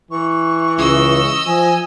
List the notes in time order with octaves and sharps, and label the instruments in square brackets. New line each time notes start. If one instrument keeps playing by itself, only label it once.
[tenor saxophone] E3 [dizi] C#6
[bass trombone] C#2 [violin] D#5 E6
[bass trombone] F3 [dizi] G#5